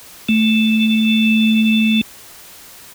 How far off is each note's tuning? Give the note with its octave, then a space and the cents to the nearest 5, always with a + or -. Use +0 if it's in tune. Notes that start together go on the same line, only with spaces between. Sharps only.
A3 +0